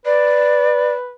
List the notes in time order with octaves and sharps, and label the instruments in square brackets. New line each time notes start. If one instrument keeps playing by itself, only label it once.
[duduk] B4 [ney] D5